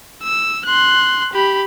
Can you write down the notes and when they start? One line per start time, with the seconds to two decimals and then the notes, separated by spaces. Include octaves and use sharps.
0.23 E6
0.65 C6 F#6
1.33 G4 B5